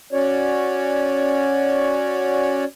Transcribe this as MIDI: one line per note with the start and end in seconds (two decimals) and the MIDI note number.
0.13 2.65 61
0.13 2.65 66
0.13 2.65 73
0.13 2.65 74